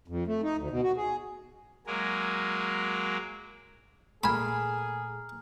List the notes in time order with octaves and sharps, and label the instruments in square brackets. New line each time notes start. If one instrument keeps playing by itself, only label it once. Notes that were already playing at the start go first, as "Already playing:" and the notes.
[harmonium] F2
A3
D#4
D2
B2
F#4
G#4
[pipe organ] F#3 G#3 A#3 G#4 A#4
[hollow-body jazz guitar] A#2 A3 A#3 [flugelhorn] G#4 [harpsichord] G#5 B5 [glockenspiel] A#5 F6